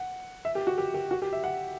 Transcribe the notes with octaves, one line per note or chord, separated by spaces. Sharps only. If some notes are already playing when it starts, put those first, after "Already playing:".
Already playing: F#5
E5
G4
F#4
G4
G4
F#4
G4
E5
F#5